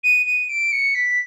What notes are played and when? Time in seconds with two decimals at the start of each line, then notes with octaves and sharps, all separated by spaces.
0.04 D#7
0.26 D#7
0.49 D7
0.72 C#7
0.95 B6